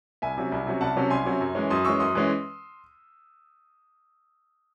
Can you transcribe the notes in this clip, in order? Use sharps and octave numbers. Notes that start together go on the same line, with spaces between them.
C2 E5 G#5
C3 F#3 C#4
C2
C3 F#3 C#4
C2 F#5 A5
C3 F#3 C#4
C2 G#5 C6
C3 F#3 C#4
F#2
E3 G#3 C#4
F#2 C6 D#6
E3 G#3 C#4 C#6 E6
F#2 C6 D#6
E3 G#3 C#4